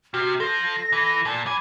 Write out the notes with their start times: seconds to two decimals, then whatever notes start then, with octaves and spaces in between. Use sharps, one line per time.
0.14 C3 F#4 F6
0.40 F3 A4 A#6
0.92 E3
1.25 A#2 A5
1.46 F3 G#5 B5 D6